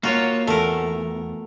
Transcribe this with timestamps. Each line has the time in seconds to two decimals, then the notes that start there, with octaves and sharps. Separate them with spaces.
0.03 A#3 F4 F#4 C#5
0.47 E2 A3 A#4